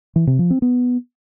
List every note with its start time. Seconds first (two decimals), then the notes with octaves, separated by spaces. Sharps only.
0.16 E3
0.27 C3
0.39 F3
0.50 C4
0.62 B3